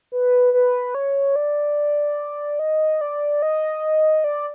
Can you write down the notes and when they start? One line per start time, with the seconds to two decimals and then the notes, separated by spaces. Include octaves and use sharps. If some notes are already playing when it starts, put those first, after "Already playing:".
0.12 B4
0.54 B4
0.95 C#5
1.36 D5
2.59 D#5
3.01 D5
3.42 D#5
4.24 D5